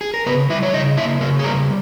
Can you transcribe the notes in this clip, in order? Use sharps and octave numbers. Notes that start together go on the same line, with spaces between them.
G#4
A#4
C#3 B3 B4
G3 E4 E5
C#5
C#3 D#4 D#5
A#3 E4 E5
C#3 A#3 A#4
G#4
G3 A#3 A#4